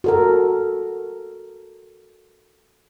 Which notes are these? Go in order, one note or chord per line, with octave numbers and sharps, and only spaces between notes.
F#4 A4 A#4